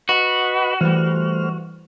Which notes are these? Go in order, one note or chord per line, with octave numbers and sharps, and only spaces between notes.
F#4 B4 D#5 B5
E3 G3 A3 C5 F6